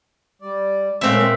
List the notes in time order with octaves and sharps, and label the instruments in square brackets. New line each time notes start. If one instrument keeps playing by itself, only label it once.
[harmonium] G3 D5
[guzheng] A#2 E5 [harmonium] G#3 A3 C#4 [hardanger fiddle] C4